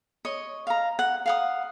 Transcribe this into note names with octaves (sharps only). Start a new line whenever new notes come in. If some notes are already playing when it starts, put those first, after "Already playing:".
C#5 D#5
F5 A#5
F#5
F5 F#5 D#6